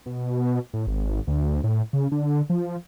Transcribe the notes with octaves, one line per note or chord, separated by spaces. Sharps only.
B2
A2
G#1
D2
A2
C#3
D3
F3